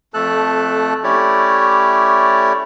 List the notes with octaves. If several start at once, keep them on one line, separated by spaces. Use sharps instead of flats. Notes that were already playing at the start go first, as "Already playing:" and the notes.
F2 A3 A4 A5 F#6
A3 C#4 E4 G4 C#5 D5